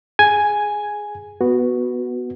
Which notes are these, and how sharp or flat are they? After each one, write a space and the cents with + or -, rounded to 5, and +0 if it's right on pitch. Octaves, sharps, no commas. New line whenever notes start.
G#4 +0 G#5 +0
B3 +0 F#4 +0